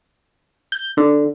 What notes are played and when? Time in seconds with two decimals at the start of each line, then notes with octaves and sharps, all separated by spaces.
0.72 G6
0.97 D3